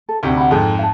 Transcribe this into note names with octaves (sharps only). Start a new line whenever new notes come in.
A4
D2 C3 D#4 D#5
F#5 B5
F2 G#2 F4 G#4 A4
F5 A5